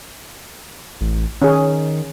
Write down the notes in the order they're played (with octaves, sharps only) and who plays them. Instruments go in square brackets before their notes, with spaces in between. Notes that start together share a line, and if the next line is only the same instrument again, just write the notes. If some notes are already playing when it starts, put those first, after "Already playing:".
[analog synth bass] A1
[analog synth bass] D#3 [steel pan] C#4 G#4